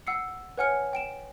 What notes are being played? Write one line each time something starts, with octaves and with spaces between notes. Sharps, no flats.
F#5 E6 C7 C#7
B4 C#5 F#5 G#5 F6 C#7
G5 D7 E7